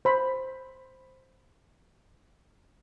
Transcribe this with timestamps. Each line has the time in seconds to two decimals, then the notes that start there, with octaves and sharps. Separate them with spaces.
0.05 C5 B5